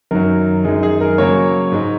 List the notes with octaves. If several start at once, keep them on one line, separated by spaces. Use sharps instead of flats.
F#2 D#3 F#3 A#4
F#2 D#3 G#3 G#4
G#4
A#4
C#3 F#3 A#3 C#5
G#2 G#3